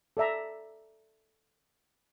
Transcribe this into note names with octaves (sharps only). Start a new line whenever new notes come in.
A4 D5 E5 A#5